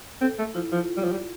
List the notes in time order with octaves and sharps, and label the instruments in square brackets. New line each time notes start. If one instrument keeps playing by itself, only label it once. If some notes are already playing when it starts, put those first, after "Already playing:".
[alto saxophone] C4 [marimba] A4
[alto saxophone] A3
[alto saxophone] F3 [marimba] E4
[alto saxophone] F3 [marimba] F4
[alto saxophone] G3
F3
G3